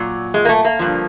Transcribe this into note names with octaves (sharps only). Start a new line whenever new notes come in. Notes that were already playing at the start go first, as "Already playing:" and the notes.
Already playing: A#2 F#3
G#3
A#3
A3
A#3
G2 D3 F3